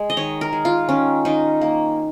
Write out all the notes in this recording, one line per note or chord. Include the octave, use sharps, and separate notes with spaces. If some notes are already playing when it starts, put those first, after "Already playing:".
Already playing: G#3
D#5
D#3 C#5
A#4
G#3
F4
D#3 C#4
D#3 D#4
A#3